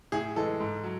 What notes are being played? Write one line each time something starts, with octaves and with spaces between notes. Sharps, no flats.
A2 G#4
E3 G#3 A4
G#2
F#3